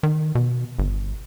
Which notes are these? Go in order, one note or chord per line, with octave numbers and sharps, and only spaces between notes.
D#3
B2
G1